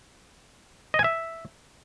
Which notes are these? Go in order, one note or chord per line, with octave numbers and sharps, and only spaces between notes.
D#5
G#5
E5